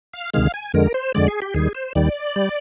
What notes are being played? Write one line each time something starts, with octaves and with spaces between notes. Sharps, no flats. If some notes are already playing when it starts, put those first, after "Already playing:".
F5
D2 C3 D#3 G#3 F5
G#5
F2 D3 G#3 A#4
C5
F2 D3 G#3 D5
G#4
G4
D#2 D#3 G3 G#4
C5
D#2 D#3 G3 D5
G3